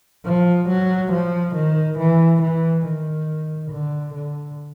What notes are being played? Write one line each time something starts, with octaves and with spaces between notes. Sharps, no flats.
F3
F#3
F3
D#3
E3
E3
D#3
D3
D3